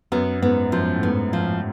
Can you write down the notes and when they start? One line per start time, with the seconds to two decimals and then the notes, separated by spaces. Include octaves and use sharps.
0.12 F#2 B3
0.42 G#2 B3
0.72 F#2 F3
0.95 A2
1.03 G#2 B3
1.33 F3